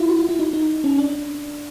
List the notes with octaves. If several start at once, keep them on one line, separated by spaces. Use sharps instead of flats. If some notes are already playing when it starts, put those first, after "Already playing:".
Already playing: E4 F4
F#4
F4
E4
D#4
D#4
C#4
D4